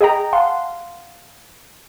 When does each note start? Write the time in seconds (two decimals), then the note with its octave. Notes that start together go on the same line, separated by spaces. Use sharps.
0.01 G#4 D#5 G5 A#5
0.33 F5 F#5 A5 C6